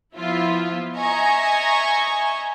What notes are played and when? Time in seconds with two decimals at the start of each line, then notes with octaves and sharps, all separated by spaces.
0.16 F3 B3 E4 F4 E5
0.97 D#5 E5 G#5 A#5 C#6